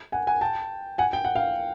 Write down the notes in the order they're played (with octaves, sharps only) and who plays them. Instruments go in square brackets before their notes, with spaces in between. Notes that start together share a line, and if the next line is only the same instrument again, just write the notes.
[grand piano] F#5 G#5
F#5 G#5
G5 A5
F#5 G#5
G5
F#5
F5 G5